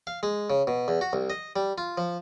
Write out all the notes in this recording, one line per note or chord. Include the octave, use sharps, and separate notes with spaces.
F5
G#3
C#3
B2
E2
F#4
C2
D#5
G3
F4
F3